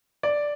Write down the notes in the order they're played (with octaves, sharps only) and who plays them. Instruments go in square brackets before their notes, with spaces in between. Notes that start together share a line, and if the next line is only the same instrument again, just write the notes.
[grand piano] D5